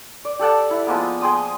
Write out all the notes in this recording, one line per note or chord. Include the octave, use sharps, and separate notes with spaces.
D5
G4 A4 F#5 A5
E4
F3 G#3 A#3 B3
G#4 G5 C6 D#6